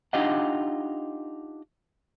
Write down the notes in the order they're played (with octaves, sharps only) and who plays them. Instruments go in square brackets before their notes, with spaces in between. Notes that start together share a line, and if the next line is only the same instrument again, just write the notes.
[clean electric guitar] D4 D#4 F4 G4 D#5 F#5